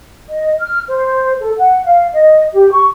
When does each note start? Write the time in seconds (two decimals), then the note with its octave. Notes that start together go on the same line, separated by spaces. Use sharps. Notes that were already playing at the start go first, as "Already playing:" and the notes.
0.29 D#5
0.61 F6
0.88 C5
1.40 A4
1.57 F#5
1.85 F5
2.13 D#5
2.54 G4
2.72 C#6